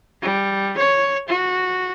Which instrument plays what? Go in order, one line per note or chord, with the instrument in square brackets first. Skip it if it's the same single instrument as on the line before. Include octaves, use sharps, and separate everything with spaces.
[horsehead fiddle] G3
C#5
F#4